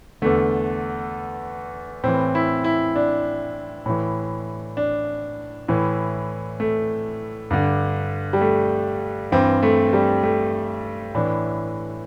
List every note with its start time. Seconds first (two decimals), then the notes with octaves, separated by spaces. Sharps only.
0.22 E2 D3 A3
2.03 A2 E3 C4
2.35 E4
2.64 E4
2.96 D4
3.86 A2 E3
4.77 D4
5.68 A2 E3
6.60 A3
7.50 G2 D3
8.33 G3
8.41 A3
9.32 G2 E3 C4
9.63 A3
9.93 G3
10.23 A3
11.15 A2 E3 D4